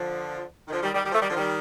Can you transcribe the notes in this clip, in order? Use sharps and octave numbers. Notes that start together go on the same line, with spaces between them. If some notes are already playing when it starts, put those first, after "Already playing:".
Already playing: D3 F3
D#3
D3 F3
D#3 G3
D#3 G3
D#3 G3
F3 A3
D#3 G3
D3 F3
D#3 G3